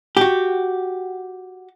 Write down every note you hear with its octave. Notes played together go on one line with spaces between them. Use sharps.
F#4 G4